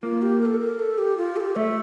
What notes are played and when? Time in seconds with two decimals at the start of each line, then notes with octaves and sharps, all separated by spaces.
0.03 A#3 F4
0.22 G4
0.41 A#4
0.46 A4
0.60 A#4
0.79 A4
0.98 G4
1.17 F4
1.36 A4
1.40 G4
1.56 A3 E5